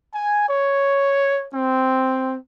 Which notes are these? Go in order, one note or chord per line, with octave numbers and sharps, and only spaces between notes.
G#5
C#5
C4